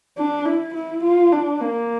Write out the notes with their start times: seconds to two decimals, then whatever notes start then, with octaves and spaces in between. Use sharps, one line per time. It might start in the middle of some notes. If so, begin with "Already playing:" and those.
0.18 D4
0.46 E4
0.74 E4
1.03 F4
1.32 D4
1.60 A#3